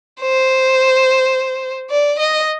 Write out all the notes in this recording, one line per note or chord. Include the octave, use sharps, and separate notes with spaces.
C5
D5
D#5